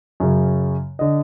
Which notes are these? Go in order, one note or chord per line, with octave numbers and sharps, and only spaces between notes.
F#2 C#3
D3 D#5